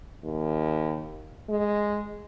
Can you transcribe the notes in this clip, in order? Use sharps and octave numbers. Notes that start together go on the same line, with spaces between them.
D#2
G#3